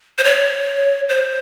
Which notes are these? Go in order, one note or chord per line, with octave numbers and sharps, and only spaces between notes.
C5
C#5
C5